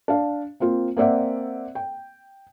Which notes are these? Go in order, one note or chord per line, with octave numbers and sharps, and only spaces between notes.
D4 F5
A#3 C4 F4
A#3 C4 D5 E5 F#5
G5